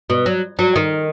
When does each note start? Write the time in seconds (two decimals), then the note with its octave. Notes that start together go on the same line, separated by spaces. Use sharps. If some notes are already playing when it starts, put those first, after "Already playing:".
0.10 B2
0.26 F#3
0.59 F#3
0.76 D#3